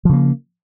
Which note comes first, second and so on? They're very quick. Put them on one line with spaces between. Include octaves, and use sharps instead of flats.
F3 C#3 A#3